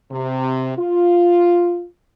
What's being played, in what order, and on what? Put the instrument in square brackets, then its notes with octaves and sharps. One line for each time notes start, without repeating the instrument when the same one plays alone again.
[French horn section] C3
F4